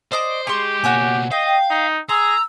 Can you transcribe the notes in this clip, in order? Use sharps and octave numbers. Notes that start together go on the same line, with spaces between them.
C5 D5 D#5 D6
G#3 G4 G#4 C6 C#6
B2 A#3 F#4 C#5 G#5
D#5 F5 G5
D#4
G#4 A#5 C6 E6